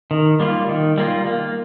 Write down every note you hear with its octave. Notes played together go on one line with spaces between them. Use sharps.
D#3
G3 A#3 F4
D#3
G3 A#3 F4
A#3